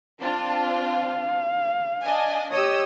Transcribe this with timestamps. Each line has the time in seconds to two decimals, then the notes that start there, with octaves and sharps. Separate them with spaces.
0.21 C4 D4 F4 A5
0.69 F5
2.02 D4 D#5 G#5
2.52 G4 C#5 D#5 D#6 E6